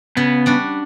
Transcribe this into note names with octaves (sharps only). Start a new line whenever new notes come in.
C#3 B3
G3 D4 F#4